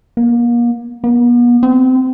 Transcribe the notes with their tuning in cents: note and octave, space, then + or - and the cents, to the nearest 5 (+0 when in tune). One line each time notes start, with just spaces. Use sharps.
A#3 +35
B3 -40
C4 -25